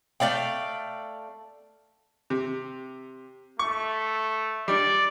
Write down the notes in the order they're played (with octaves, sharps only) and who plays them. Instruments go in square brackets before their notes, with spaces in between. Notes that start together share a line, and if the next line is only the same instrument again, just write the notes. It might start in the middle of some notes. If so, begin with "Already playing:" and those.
[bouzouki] A3 D5 F5 G5
[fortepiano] C3
[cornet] A3 [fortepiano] C#6
[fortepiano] G3 D4 [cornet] D5